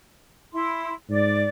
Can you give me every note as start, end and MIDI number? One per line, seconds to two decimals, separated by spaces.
0.54 0.94 64
0.54 0.94 84
1.09 1.47 44
1.09 1.48 74